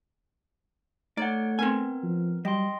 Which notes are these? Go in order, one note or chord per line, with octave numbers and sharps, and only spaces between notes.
A3 D#4 C#5 D5 F#5
B3 C4 A#4 G#5
F3
F#3 G3 D#5 G5 C6